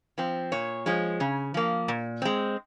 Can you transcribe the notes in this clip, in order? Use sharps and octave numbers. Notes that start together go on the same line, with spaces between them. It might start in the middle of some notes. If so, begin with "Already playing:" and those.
F3 C4
A#2 C#5
F3 G#3
C#3
F3 A#3
A#2
G#3 C4